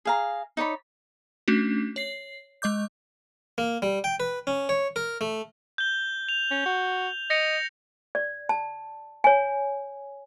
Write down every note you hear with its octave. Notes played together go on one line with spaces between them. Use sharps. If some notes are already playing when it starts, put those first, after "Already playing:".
G#4 F5 A#5
D#4 C#5 D5 B5
A3 C#4 D4 F#4
C#5 C7
G#3 D#5 D6 G6
A#3
G3
G5
B4
C#4
C#5
A#4
A3
G6 G7
F7
C#4
F#4
D#5 A#6 C#7 F7
D5
A5
C#5 G#5